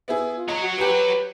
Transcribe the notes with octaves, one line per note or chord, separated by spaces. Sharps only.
B3 E4 G#4
F4
F#3 C#5 D#5
F#4
F#4 G4 B4